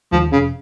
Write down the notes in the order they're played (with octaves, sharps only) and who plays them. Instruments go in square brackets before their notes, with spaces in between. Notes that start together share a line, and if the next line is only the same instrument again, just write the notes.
[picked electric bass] D#2 D#3 G#3 [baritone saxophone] F3
[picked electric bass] F1 [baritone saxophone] C#3